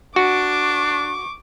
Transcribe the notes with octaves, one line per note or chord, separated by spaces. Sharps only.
D4 F#4 C#6 D6